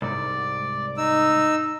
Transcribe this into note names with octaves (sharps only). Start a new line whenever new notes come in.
C2 G#2 D5
D#4 E6